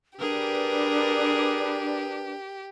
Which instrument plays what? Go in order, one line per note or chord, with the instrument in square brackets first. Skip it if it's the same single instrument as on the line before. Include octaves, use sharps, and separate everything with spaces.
[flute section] D4 B4 [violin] G4 [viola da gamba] G#4 A#4